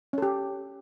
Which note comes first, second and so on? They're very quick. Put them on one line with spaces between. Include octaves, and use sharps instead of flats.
C#4 A4 G4